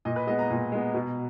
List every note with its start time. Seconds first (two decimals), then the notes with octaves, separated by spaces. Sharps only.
0.05 A#2 D#5
0.16 B4
0.27 G#3 B3 D#5
0.39 A#5
0.50 A#2
0.72 G#3 B3
0.94 B2